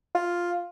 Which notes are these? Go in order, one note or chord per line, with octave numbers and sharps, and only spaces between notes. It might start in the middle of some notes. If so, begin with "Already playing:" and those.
F4